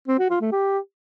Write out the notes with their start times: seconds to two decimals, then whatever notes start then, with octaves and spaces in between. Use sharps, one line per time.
0.08 C4
0.19 F#4
0.30 F4
0.41 A3
0.52 G4